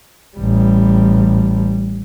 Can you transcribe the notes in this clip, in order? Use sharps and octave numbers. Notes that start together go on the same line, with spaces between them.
A1 G3